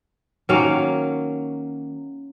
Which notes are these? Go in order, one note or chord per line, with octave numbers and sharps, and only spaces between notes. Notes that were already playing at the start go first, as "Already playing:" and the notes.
D#3 F#3 A#3 C#4 F5